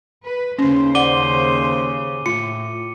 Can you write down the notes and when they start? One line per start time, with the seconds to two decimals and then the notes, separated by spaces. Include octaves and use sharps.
0.24 B4
0.59 D#2 C#3 C#4 C5
0.95 D5 F#5 D6 D#7 G7
2.26 A2 F4 C#7